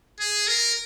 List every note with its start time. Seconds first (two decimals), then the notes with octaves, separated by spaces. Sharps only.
0.20 G#4
0.48 A#4